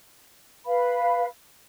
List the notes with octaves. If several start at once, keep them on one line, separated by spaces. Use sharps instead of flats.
B4 F5 B5